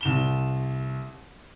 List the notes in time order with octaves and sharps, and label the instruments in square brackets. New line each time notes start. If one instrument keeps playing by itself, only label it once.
[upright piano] C2 E7 G7